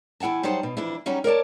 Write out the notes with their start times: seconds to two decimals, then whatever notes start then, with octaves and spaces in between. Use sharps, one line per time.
0.20 E2 E4 F#5 G#5 A5
0.43 F#3 G3 D#4 C5 F#5 A5
0.63 B2
0.77 F2 E3 D4 E4
1.06 F#3 G3 C#4 D#4 F#4
1.24 A#4 C#5 D5 A5